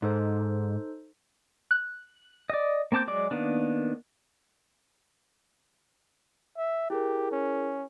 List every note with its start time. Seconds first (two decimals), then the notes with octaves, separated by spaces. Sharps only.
0.02 G#2 D#4 A4 C5
1.71 F#6
2.50 D5 D#5
2.92 A#3 C4 A5 D6 G6
3.07 F#3 G#3 D5 D6
3.31 D#3 A#3 B3 D4
6.57 E5
6.90 E4 G4 G#4 A#4
7.32 C#4